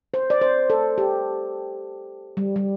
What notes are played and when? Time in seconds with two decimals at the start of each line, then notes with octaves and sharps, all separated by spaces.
0.14 C5
0.30 D5
0.41 C5
0.70 A4
0.98 G4
2.37 G3
2.56 G3